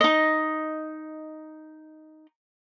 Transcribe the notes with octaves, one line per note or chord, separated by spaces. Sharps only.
D#4 D#5